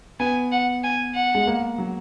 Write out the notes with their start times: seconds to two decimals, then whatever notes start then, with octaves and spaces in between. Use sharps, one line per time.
0.20 B3 G#5
0.52 F#5
0.84 G#5
1.15 F#5
1.35 G#3
1.47 A#3
1.78 F#3